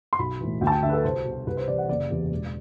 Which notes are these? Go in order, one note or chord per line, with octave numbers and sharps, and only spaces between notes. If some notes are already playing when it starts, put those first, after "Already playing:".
C6
B1 B5
A2 E3
D2 G5
A5
G5
D3 E5
B4
A4
C2 C5
B2
C2 B4
C5
C3 E3 D5
F#5
F#1 D5
E2 C3 E3
E1